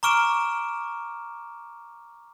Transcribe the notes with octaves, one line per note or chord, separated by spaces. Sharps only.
A#5 C#6 D6 F6 D7 E7